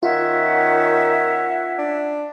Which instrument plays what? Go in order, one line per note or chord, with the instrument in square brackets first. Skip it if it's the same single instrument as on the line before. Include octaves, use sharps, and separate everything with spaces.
[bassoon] D#3 [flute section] C#4 E5 F#5 [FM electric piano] F4
[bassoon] D4